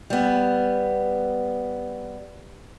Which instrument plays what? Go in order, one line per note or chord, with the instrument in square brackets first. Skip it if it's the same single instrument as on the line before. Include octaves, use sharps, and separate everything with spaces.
[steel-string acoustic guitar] G3 B3